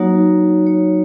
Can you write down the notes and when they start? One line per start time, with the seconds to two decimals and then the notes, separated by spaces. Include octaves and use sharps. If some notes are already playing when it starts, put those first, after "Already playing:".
Already playing: F#3 A#3 D#4 F#4 C#5
0.67 C#5